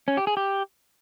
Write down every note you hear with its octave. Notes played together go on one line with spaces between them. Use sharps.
C#4
G4
G#4
G4